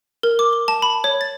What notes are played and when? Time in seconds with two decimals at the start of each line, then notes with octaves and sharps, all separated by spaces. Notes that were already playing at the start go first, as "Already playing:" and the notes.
0.23 A#4
0.39 D6
0.53 G7
0.68 A5
0.82 B5
1.04 C#5
1.21 A6